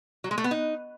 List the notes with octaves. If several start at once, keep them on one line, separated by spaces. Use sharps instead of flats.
F#3
G#3
A3
B3
D#4